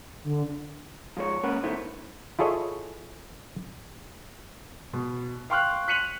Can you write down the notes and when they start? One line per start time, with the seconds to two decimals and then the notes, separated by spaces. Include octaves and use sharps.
0.24 D3
1.17 F3 G#3 C#5
1.44 G#3 A#3 C#4 A#4 B4 F#5
1.64 G2 D#3 A3 B3 E4 C5
2.39 E4 F4 G#4 A4 C#5 D#5
4.93 B2
5.50 F5 G5 C6 C#6 F6 F#6
5.88 F#6 B6 C#7 D#7 F7 F#7